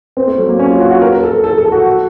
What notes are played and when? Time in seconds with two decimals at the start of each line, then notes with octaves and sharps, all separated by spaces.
0.17 C4
0.27 A3
0.38 F#3
0.49 A#3
0.59 C#4
0.70 F4
0.80 F#4
0.91 F#4
1.02 A#4
1.13 A#4
1.23 A4
1.33 A#4
1.44 A4
1.58 A4
1.72 F#4
1.86 F#4